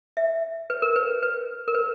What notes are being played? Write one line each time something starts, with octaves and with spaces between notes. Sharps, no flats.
E5
B4
A#4
B4
B4
A#4
B4